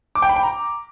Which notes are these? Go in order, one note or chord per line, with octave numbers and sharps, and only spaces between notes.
D6
G5
B5
G5
A#5